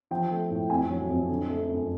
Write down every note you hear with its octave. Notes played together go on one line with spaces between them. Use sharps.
F3 G5
A3
A2
F2 G#5
F#3
F2
D3
A3
F#2